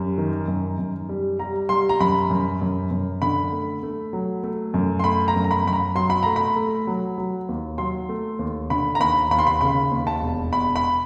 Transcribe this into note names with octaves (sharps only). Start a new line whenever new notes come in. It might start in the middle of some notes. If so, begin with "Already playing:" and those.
Already playing: F#2 G3
D#3
F#2
F#2
G3
G3 A#5
G3 C6
A#5
F#2 B5
F#2
F#2
F#2
D3 B5
A3
A3
F#3
A3
F#2
C6
A3 B5
A#5
F#2
A#5
B5
F#2 B5
A#5
F#3 C6
B5
A3 A#5
B5
A3
F#3
F#3
D#2
F#3 C6
A3
D#2
D3 B5
A#5
D#2 B5
D#2 B5
C6
B5
C#3 B5
D#2
A5
E1
E1 B5
B5